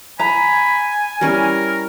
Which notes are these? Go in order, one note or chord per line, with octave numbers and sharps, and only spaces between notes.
G#5 A#5 B5
G3 C#4 E4 A#4